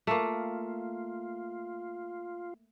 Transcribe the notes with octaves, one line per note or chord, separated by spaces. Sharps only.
A3 A#3 F4